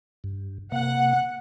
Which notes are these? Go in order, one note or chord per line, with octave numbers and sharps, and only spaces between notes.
G2
C3 A#3 F#5